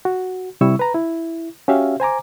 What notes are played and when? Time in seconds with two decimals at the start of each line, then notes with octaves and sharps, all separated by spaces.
0.05 F#4
0.61 C3 G3 E4 C#6 E6
0.79 B4 A#5
0.95 E4
1.68 C#4 F#4 G4 E5 F5
2.00 C5 G#5 A#5 D6